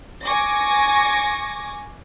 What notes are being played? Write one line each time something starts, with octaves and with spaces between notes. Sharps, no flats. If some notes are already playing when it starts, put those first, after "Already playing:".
G#5 C#6 D6 A#6